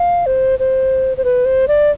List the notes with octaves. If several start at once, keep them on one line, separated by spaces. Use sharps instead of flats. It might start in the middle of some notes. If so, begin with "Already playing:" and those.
Already playing: F5
C5
C5
C5
B4
C5
D5